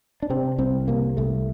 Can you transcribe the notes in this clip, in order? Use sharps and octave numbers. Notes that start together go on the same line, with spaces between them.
D4
C3 C4
C2 C4
C3 A#3
C2 A3